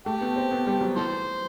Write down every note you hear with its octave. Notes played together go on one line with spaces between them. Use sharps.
A3 G4
B3
C4
B3
G3
F#3
E3 A4 C5